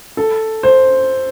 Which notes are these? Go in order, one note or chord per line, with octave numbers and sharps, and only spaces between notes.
A4
C5